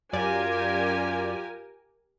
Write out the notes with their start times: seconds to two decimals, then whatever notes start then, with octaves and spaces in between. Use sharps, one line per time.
0.13 F#2 F4 G4 A#4 D5 G#5